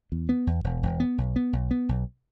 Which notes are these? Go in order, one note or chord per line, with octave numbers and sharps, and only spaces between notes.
E2
B3
E2
E1
E1
B3
B1
B3
B1
B3
B1